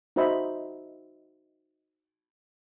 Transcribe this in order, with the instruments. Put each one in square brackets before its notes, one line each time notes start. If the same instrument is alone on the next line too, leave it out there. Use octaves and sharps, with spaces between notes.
[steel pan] D#4 F#4 C5 D#5 E5 B5